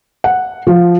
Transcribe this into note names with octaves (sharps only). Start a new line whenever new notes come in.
F#5
F3